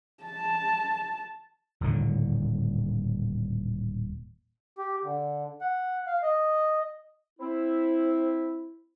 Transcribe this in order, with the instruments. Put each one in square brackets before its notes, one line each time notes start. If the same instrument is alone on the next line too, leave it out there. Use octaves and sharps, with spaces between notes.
[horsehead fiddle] A5
[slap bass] D#1 A2 D3
[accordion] G4
D3
F#5
F5
D#5
[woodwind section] C4 E4